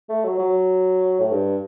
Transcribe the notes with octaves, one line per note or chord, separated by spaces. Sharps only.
A3
F#3
F#3
A2
G2